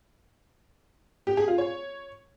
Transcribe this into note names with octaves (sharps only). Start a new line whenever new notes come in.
G4
G#4
F4
C#5